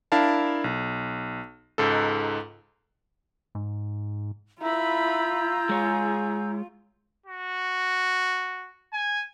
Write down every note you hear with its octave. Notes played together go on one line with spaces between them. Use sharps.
D4 E4 A#4 F5 A5
B1
C#2 G#2 D#4 A4
G#2
E4 F4 A#5 B5 E6 G6
G#3 G#4 C#5
F#4
G#5